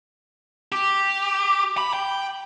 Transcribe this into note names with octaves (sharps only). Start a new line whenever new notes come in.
G4
B5
G5